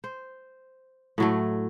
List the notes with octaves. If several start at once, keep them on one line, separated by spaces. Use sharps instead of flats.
C5
A2 F#3 A3